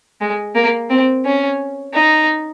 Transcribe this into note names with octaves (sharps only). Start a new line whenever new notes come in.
G#3
A#3
C4
C#4
D#4